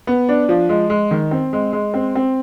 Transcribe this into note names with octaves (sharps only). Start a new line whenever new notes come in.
B3
D4
F3
G#3
G#3
D#3
C4
G#3
G#3
C4
C4